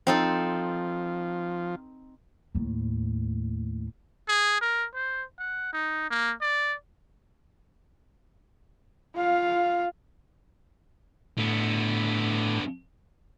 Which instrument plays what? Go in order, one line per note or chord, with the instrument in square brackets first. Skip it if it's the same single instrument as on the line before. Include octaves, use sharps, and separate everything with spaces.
[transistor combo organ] F3 [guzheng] C4 D#4 A4
[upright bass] D#2 A2
[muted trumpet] G#4
A#4
C5
F#5
D#4
A#3
D5
[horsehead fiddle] F4 F5
[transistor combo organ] A2 [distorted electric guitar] D3 B3